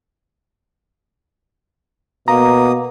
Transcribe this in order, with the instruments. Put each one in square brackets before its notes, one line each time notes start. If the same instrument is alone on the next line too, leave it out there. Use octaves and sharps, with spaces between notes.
[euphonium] B2 [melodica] A#3 D#6 [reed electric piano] A#5